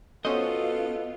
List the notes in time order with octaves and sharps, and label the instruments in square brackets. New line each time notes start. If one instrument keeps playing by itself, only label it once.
[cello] B3 F4 [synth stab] C#4 F#4 C5 [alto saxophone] A4 [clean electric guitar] D#5